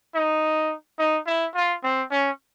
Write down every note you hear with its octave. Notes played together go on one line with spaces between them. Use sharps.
D#4
D#4
E4
F4
C4
C#4